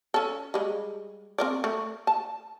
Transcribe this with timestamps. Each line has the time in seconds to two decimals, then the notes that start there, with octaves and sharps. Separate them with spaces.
0.14 C#4 A4
0.54 G3 G#3
1.38 C4 A#4 D5
1.64 A3
2.07 A5